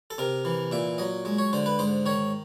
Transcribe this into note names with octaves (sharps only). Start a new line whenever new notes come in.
A4
C3 A#4
E3
A#2 E5
F#3 D#5
G#3
C#5
D3 C5
B4
G#2 C5
D#3 C#5